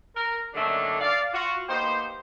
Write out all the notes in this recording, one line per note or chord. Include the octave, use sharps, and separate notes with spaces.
A#4
F#2 D3 D#3 A3 A#3 D4
D5 F5
F4 F#4
A#3 B3 D#4 G4 C5